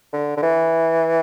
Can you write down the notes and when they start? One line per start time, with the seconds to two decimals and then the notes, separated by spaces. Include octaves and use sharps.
0.13 D3
0.37 D3
0.43 E3